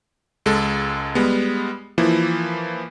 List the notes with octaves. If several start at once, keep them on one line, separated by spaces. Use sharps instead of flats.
C#2 G#3 A4
G3 G#3 B3
E3 F3 A#3 E4